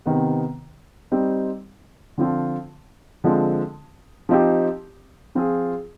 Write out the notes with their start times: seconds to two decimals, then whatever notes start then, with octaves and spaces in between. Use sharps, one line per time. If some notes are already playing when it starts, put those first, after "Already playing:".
0.06 C3 D#3 B3
1.12 G3 C4 D#4
2.18 D3 F3 C4 F4
3.24 D3 F3 G#3 C4
4.29 F3 C4 D#4 G4
5.35 F3 C4 F4 G#4